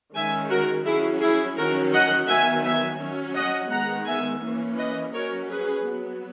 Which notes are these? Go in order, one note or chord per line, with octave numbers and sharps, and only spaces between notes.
D#3 G#3 C#4 E5 G#5
F#4 A#4
F#3 C#4 E4 G#4
E4 G#4
D#3 F#3 C#4 F#4 A#4
D#5 F#5
D#3 F#3 B3 E5 G#5
E5 G#5
F#3 C#4
D#5 F#5
D#3 G#3 B3 F#5 A#5
E5 G#5
E3 A#3 C#4
B4 D#5
F#3 C#4 A#4 C#5
G#4 B4
F#3 B3